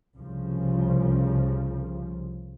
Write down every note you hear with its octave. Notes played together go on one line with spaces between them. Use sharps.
C2 C#3 F3